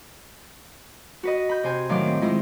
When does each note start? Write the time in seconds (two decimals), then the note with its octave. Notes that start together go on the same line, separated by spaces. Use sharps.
1.23 F#4 B4 D#5
1.49 B5 G6
1.63 C3 C5 G#5
1.89 A2 D#3 F#3 F5 D6
2.07 C4
2.21 D#3 G#3 E4 F4